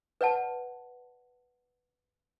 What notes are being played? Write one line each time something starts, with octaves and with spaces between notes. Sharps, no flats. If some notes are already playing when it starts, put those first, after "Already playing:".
B4 D5 F#5 A5